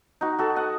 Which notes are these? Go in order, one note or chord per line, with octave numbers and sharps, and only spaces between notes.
D#4 F#4
F#4 A4
D#5 F#5